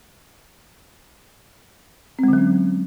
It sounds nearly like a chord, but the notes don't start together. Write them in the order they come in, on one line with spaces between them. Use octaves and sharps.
C4 G#3 D3 F#3 C#4